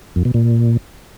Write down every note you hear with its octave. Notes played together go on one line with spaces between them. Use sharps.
F2
B2
A#2